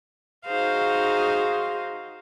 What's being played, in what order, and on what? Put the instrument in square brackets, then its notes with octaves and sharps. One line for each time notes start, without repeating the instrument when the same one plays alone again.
[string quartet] D#4 F#4 G#4 C5 F5